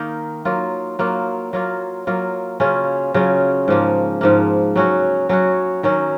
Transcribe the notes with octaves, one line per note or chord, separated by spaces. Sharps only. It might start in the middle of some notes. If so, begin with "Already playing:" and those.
Already playing: D#3 A#3 D#4
F#3 A#3 F4
F#3 A#3 F4
F#3 A#3 F4
F#3 A#3 F4
C#3 F#3 C#4 F4
C#3 F#3 C#4 F4
G#2 F3 A#3
G#2 F3 A#3
F#3 C#4 F#4
F#3 C#4 F#4
D#3 F#3 C#4